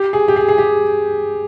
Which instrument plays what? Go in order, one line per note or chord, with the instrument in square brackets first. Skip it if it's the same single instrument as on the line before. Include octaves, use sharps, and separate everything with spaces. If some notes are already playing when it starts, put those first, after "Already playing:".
Already playing: [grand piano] G4
G#4
G4
G#4
G#4
G4